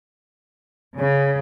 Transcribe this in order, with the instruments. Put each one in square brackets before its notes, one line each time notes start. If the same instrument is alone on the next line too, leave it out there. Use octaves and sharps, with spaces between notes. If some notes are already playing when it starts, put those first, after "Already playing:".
[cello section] C#3